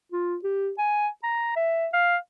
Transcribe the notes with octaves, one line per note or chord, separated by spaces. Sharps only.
F4
G4
G#5
A#5
E5
F5